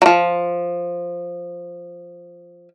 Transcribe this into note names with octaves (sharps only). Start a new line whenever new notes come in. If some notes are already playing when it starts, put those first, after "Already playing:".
F3 F#3